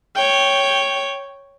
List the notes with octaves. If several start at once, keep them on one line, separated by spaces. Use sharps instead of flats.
C#5 G5